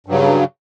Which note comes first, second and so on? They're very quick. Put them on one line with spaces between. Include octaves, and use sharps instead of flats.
G2 F#3 C#3